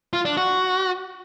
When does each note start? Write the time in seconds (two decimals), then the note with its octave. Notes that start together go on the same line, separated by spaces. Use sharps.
0.13 F4
0.25 D4
0.37 F#4